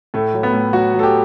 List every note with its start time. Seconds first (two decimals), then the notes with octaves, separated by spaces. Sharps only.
0.14 A2 A3
0.34 F#3
0.43 B3
0.53 A2
0.73 F#3 F#4
0.94 F#3
0.99 A4
1.03 G4